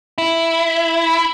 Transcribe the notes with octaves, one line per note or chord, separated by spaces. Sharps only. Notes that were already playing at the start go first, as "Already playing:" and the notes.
E4